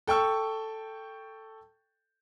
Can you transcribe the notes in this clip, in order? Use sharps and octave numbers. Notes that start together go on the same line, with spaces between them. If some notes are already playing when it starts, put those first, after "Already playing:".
A4 G5 C#6 E6